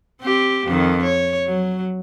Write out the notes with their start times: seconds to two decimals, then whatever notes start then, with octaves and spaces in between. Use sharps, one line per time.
0.22 C4 G4
0.66 F2 D#3
1.03 C#5
1.47 F#3